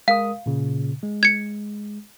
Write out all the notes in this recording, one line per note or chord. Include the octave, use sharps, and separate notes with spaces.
G#3 A#4 F5 D#6
A#2 C#3
G#3
G#6 C#7